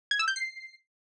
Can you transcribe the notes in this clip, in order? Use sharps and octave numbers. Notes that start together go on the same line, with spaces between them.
G#6
E6
G6
C7